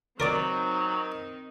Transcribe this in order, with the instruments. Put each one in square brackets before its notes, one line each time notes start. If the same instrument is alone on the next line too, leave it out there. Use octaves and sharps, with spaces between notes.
[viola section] D#3 C4 D#4 [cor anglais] F#3 [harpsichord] A#4 D5 D6